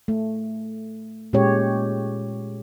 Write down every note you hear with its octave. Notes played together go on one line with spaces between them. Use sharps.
A3
A#2 G#3 C#4 G4 C#5